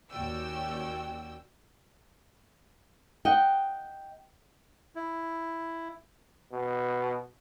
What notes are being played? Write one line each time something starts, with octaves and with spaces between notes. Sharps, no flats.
D#2 C#4 F#4 D5 G5 E6
D#5 F#5 G5
E4
B2